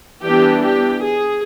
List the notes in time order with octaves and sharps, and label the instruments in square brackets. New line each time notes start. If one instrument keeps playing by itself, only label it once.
[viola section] E3 G3 B3 D4 G4
G4
G#4